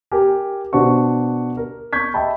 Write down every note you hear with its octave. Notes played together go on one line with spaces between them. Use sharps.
G4 A#4 G#5
B2 D4 F#4 C5 C#6
A#4
C#6 G6 G#6 B6
D#5 E5 G5 A5 B5